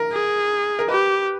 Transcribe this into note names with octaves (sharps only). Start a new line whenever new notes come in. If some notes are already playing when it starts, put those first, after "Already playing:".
Already playing: A#4
G#4
A#4
G4 B4